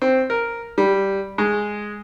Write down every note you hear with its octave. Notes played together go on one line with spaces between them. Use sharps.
C4
A#4
G3
G#3